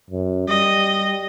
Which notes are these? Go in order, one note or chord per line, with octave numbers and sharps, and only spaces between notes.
F#2
G3 D#5